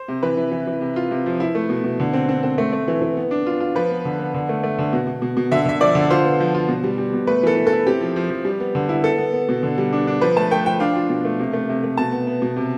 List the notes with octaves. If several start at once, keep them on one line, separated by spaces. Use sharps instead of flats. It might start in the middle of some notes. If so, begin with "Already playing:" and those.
Already playing: C5
C3
E3 B4
E3
E3
E3
C3
F4
C3
F3
E4
A3
B2
B2
D3
C4
C4
C4
A3
A3
E3
E3
B3
D4
F4
F4
F3 B4
B3
D3
B3
D3
A3
A3
D3
B2
B2
B2
B2
D3 E5
D3 E5
F3 D5
D3
F4 C5
B3
F3
F4
B2
G3
G3
B2
A3 B4
E3 A4
E3
A4
E4
C4 G4
F3
F3
F3
G3
B3
D3
E4
B3 A4
B3
B3
B2
D3
G3
D4
D4
F3 B4
A3 A5
A3 G5
F3 G5
D4 F5
F4
B2
A3
C3
A3
C3
A3
B2 A5
B3
B3
B2
C3